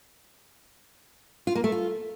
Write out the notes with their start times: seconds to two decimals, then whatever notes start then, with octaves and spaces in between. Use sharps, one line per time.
1.47 F4
1.55 A#3
1.64 A3
1.72 F4